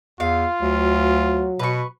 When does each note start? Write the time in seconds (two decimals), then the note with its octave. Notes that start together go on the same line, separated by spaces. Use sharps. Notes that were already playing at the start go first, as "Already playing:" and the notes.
0.20 E2 F4 F5
0.62 D2 F#3
1.59 B2 B4 C#6